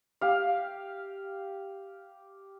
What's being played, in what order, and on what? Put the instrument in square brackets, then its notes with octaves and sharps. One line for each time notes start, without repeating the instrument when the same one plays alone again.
[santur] G4 F5